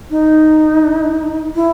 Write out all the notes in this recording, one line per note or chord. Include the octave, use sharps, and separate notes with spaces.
D#4
E4